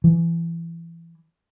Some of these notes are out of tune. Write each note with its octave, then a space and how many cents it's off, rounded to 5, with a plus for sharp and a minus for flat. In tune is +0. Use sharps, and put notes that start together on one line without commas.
E3 +25